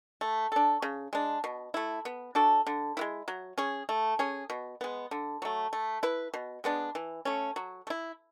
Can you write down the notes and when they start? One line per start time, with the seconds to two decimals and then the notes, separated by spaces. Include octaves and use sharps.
0.21 A3
0.52 D4 A4
0.82 C#3
1.13 G#3 D4
1.44 B2
1.74 A3 E4
2.05 B3
2.35 D4 F#4 A4
2.67 D3
2.97 G#3 B3 E4
3.28 F#3
3.58 C#4 G#4
3.89 A3
4.19 C#4 G#4
4.50 B2
4.81 G#3 B3
5.11 D3
5.42 F#3 A3
5.73 A3
6.03 E4 B4
6.34 B2
6.64 G#3 B3 D4
6.95 E3
7.25 A3 C#4
7.56 F#3
7.87 A3
7.90 E4